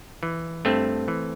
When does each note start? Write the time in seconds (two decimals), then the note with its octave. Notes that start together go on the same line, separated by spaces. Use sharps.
0.23 E3
0.65 G2 A3 C4
1.08 E3